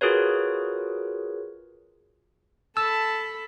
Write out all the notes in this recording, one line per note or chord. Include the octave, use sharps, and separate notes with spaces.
F4 F#4 G#4 A#4 B4 C#5
A4 A5 B5 E6